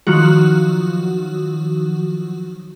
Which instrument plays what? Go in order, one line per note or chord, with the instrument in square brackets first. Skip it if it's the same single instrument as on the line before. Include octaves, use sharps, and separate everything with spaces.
[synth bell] D#3 F3 F#3 F#4